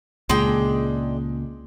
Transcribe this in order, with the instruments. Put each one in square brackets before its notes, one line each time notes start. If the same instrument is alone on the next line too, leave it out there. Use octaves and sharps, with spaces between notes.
[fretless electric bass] C#2 A#2 [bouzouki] G#3 D4 G5